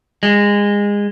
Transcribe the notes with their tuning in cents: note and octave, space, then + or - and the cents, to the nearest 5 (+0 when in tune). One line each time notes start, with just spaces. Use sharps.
G#3 -25